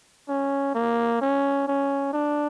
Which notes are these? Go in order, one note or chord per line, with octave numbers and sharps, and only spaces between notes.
C#4
A#3
C#4
C#4
D4